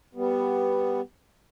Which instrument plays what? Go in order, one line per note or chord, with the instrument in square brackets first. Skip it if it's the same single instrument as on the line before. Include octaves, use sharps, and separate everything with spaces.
[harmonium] G3 B3